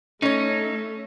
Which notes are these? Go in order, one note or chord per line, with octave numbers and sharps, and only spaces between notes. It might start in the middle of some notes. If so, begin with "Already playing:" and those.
A3 C#4 D#4 C#5 E5